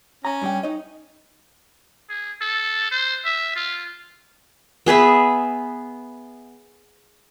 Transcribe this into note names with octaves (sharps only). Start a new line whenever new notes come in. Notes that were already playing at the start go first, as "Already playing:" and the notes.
C#4 A#5
G2 G3 G5
D#4 C#5 D#5
G#4
A4
C5
E5
F4
B3 G#4 B4 E5